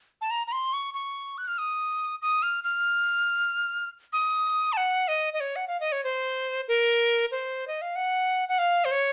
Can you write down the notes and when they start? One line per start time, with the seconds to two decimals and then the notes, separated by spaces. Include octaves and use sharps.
0.21 A5
0.31 A#5
0.47 A#5
0.52 C6
0.73 C#6
0.94 C#6
1.38 F#6
1.48 F6
1.58 D#6
2.22 D#6
2.43 F6
2.64 F6
4.13 D#6
4.73 A5
4.77 F#5
5.08 D#5
5.33 D#5
5.40 C#5
5.56 F#5
5.68 F5
5.80 D#5
5.92 C#5
6.04 C5
6.68 A#4
7.31 C5
7.68 D#5
7.82 F5
7.96 F#5
8.49 F#5
8.59 F5
8.85 C5
8.91 C#5